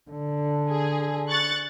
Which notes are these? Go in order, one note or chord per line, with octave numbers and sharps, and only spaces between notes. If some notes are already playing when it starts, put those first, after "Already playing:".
D3
G#4
C#6 F#6 A6